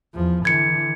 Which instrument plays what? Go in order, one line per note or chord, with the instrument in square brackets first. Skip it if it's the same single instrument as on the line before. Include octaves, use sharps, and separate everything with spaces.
[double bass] E2 F3
[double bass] D3 E3 [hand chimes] G#6 C#7